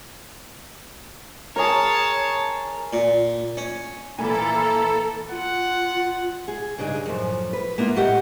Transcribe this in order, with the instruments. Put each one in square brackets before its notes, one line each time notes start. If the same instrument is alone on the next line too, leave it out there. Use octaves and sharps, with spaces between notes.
[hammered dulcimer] G#4 A#4 [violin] C#5 A5
[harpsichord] A#2
C#4
[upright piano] A#2 G#5 [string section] E3 A#3 E4 [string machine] A4 [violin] A#5
[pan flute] F4 [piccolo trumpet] F#5
[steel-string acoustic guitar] G#4
G2 C#3 D4 D#4 G#4
F#2 A2 F3
B4
A#3 B3 E4 F4
A2 A3 G4 D#5 F#5